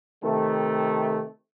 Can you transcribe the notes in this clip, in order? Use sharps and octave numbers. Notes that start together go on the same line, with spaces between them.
C3 D#3 A3